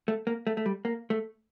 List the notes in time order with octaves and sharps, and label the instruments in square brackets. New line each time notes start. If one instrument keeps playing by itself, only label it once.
[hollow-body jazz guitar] A3
A#3
A3
A3
G3
A#3
A3